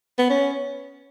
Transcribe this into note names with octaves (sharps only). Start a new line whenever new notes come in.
B3
C#4